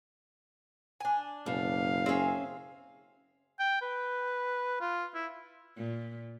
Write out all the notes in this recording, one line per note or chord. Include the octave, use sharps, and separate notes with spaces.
D4 G#5
F#1 B2 F5
C4 C#4 G#4 E5
G5
B4
F4
E4
A#2